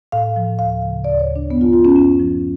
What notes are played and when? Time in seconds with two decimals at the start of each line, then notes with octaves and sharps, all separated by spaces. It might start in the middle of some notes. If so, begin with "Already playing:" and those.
0.12 A2 F5
0.36 F3
0.59 D2 F5
0.82 C#3 F3
1.04 D2 D5
1.19 C#5
1.27 C#3 F3
1.36 D4
1.50 F#2 B3
1.61 F4
1.73 F3 F4
1.85 C#4
1.96 F#2 C#4
2.19 F3